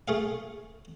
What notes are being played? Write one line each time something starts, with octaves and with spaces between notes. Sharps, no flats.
A3 G#4 F5